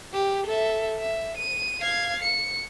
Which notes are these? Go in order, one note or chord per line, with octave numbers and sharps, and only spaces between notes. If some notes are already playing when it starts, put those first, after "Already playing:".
G4
A4 E5
E5
D#7
F5 G#6
C#7